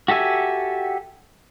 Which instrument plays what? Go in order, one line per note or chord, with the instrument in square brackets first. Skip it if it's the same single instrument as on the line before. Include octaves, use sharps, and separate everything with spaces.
[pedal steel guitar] F#4 G4 A4 E5 G#5